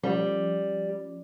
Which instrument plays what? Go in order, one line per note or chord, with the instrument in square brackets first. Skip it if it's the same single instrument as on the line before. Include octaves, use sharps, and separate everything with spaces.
[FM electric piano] F3 C#4 [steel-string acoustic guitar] G3